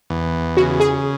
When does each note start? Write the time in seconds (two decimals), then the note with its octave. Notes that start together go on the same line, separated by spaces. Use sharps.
0.10 E2
0.56 C#3 F#4
0.80 G#4